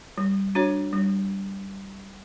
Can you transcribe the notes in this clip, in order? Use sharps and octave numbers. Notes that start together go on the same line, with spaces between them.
G3
D4 F#4 C#5
G3